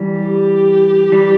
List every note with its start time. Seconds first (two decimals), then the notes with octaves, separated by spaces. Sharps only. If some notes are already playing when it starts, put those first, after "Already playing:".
Already playing: E3 G3
0.19 G4
1.12 E3 G3